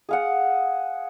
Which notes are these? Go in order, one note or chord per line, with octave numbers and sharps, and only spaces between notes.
G#4 F5 F#5